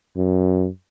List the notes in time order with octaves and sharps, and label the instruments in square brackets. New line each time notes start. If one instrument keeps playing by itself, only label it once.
[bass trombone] F#2